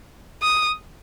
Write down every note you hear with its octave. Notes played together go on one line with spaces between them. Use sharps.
D#6